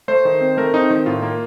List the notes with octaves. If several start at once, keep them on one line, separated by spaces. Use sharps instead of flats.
A3 C5
D#3
C4
A3 A#4
C4 D#4
D#3
A2 F4
A#3